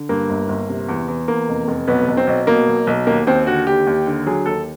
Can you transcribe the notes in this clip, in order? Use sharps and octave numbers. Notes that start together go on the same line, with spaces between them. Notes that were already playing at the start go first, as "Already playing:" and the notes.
Already playing: D3
G2 A#3
G1
G1
C3
E2
E2
E2 A#3
F1
F1
B1 B3
B1
C4
B1
B2 A#3
B1
B1
D#2 A#3
D#2 C4
D3 F#4
D#2 G4
D#2
D3
F#3 G#4
D#2 A4